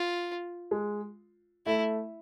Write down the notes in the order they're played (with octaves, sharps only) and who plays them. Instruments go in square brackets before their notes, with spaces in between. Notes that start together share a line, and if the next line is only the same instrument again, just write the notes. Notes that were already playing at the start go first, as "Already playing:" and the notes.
Already playing: [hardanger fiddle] F4
[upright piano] G#3
[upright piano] A3 [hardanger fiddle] E4